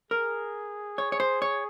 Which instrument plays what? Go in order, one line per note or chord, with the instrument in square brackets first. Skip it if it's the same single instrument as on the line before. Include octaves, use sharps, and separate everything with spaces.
[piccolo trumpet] G#4 [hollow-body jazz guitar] A#4
[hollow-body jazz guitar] C#5
C#5
C5
C#5